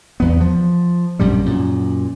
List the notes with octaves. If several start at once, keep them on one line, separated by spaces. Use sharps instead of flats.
E2 B3
F3
A#1 F#2 C3 G3
F#2 A#2